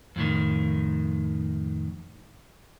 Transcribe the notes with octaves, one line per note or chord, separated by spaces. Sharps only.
F2 A2 D#3